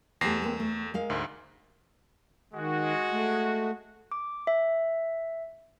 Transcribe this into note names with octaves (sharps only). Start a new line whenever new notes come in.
E2 A3 G4 G#4 A#6 C7
G#3 A#3 C4
A3
G#3 A#4 F5
D2 G#2
D#3 G#3 F#4
A3
D6
E5